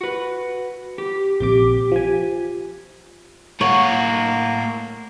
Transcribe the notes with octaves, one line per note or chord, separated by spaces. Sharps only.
F#4 B4
G4
A#1 C3 G4 D6
F3 G#5
A2 A#3 C#5 F#5